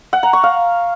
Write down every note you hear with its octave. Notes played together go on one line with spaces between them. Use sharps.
F#5
A#5
C#6
F5